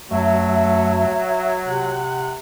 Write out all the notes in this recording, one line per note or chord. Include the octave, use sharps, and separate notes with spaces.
F#2 F#3 A3 E5
C3 F#5